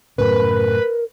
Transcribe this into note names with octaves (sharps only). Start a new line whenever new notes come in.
F#2 A2 C#3 A#4 B4